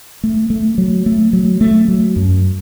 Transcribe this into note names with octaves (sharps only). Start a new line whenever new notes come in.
A3
A3
F#3
A3
F#3
A3
F#3
F#2